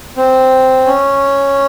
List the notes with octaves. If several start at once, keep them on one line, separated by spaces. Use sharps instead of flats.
C4
C#4